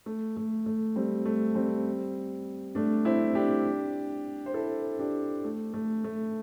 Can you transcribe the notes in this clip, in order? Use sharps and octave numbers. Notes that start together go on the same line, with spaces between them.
A3
A3
A3
G3 C4
A3
G3 C4
A3 D4
C4 E4
D4 G4
C5
E4 A4
D4 G4
A3
A3
A3